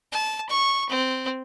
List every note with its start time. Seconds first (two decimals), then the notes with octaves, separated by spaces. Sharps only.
0.12 A5
0.49 C#6
0.89 C4